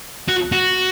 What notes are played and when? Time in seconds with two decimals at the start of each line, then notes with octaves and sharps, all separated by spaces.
0.29 F#4
0.52 F#4